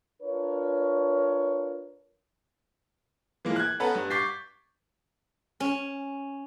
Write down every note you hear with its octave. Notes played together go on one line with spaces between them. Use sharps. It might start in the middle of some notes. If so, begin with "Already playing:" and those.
D4 F4 A#4 B4 C#5
E3 F3 G#3 A#3
F#6 G#6
B3 C#4 A4 B4 F#5 A#5
G2
C#6 D6 G6 A6 B6 C7
C#4